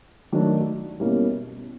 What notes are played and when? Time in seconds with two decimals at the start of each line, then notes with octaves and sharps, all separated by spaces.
0.32 D#3 F#3 A3 D4 F#4
1.00 B2 G3 A#3 C#4 E4